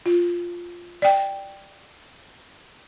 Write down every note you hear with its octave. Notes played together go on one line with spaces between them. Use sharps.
F4
D5 G5